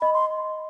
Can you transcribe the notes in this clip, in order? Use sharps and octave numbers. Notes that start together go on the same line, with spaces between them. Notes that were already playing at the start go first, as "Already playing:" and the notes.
D#5 B5
C6